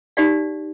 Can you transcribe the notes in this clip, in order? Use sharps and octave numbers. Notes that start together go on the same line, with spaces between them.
D#4 G4 D5 F5